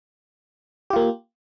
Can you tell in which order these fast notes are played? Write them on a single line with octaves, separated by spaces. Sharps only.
G4 F4 A#3